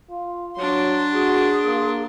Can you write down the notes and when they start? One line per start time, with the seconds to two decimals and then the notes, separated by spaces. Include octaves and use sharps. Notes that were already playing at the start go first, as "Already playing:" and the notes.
0.10 F4
0.57 F#3 D4 C6
1.12 F#4 G#4
1.64 A#3